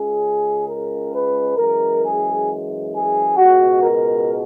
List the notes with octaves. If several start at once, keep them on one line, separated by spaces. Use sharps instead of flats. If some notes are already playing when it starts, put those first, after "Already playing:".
Already playing: C#2 C#3 G#3 G#4
A#4
B4
F#2 E3 G#3 A#4
G#4
G#4
C#2 B2 G#3 F#4
A#4